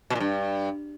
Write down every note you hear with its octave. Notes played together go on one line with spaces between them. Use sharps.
B2
A#2
G2